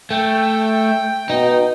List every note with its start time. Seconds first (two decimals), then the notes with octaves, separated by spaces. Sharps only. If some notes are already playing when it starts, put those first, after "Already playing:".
0.11 A3 G5
1.30 B2 D#4